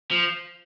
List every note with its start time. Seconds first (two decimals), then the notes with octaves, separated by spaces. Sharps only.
0.11 F3